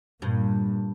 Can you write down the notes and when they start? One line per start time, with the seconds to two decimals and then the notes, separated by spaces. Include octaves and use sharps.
0.22 G2 A#2